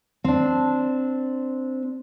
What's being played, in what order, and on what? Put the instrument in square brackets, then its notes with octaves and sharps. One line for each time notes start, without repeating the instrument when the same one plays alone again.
[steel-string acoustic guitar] C4 D4